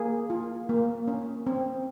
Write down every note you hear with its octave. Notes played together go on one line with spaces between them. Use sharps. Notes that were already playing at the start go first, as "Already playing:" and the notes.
Already playing: A#3 G#4
F4
A#3
C#4
C4